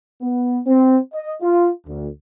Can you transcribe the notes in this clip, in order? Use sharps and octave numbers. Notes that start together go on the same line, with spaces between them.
B3
C4
D#5
F4
D2